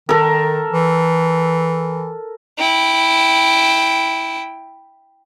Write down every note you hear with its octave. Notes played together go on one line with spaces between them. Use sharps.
D#3 A4 A#4
E3
E4 G5